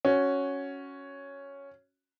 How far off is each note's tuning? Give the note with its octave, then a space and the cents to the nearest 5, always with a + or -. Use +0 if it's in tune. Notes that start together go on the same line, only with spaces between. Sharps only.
C#4 +0 F#4 +0